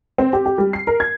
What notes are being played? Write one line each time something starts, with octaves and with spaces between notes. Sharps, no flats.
C4
G4
G4
G3
C7
A#4
G#6